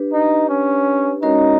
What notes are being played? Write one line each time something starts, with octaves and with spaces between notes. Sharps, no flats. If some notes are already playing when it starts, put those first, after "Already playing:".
Already playing: D4 G4 B4
D#4
C#4
G#3 C#4 D#4 F#4 A#4 C#5